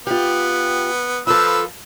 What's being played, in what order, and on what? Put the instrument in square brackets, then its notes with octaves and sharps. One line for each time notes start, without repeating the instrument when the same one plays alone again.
[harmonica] B3 [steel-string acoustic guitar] F4 G4
[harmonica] F3 B4 E6 [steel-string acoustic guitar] F4 A4